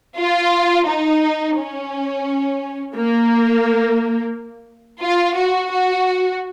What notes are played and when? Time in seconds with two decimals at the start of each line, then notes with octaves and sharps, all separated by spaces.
0.18 F4
0.87 D#4
1.56 C#4
2.95 A#3
5.02 F4
5.37 F#4
5.71 F#4